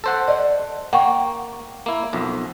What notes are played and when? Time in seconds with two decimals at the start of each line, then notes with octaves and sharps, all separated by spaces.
0.04 A4 C5 F#5
0.28 D5 D#5
0.93 A#3 F#5 G5 C#6
1.86 A#3 E4
2.13 B1 F2